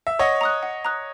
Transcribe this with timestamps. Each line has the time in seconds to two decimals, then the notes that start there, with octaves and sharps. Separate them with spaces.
0.07 E5
0.19 C#5 D#5 F#5
0.41 A#5 D#6 F#6
0.63 F#5
0.85 A#5 D#6 F#6